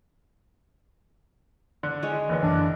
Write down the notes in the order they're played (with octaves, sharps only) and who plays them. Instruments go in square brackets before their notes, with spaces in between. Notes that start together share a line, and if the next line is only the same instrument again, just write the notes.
[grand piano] D3
[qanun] G#3 C#5
[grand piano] F#1 D3 [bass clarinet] E3
[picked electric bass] F#2 E3 [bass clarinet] D4